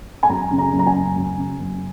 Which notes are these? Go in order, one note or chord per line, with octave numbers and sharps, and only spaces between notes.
G#5
F#2 A#5
C#3
A#5
F#1
A#5
G#5
F#1
F#2
C#3
F#1